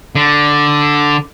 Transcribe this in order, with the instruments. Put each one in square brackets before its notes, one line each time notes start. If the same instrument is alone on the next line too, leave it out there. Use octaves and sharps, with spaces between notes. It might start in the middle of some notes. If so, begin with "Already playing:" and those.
[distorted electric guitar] D3